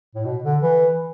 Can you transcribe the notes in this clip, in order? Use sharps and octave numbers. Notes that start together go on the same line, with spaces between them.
A2
B2
D3
E3